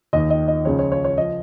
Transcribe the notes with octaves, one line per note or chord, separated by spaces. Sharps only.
D#2 D#3 D#5
D#5
D#5
C#2 C#3 F3 C#5
C#5
C#5
C#5
F3 D#5